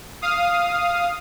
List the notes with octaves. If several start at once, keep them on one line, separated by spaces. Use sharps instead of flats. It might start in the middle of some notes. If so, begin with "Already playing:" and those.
F5 D#6